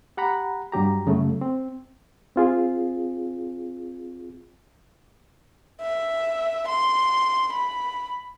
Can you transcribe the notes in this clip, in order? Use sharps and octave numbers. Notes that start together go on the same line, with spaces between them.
G4 F#5 A#5 B5
G2 F#3 G4 A#5
F#2 C#3 A3
C4
C4 F4 G#4
E5
C6
B5